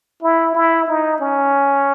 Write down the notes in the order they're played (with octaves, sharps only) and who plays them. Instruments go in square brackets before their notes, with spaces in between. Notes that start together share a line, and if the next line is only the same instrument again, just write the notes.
[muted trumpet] E4
E4
D#4
C#4